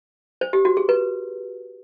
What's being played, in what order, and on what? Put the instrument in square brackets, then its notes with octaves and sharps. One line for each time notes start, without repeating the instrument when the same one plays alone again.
[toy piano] C5
G4
F#4
G#4
B4